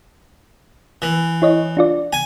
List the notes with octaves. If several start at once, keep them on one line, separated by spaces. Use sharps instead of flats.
E3
E4 C#5 D#5
D4 F4 D5
G#5